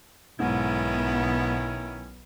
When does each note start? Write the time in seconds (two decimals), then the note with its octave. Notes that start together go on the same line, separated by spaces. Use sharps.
0.40 B1 G#2 D#3 B3 C#4 E4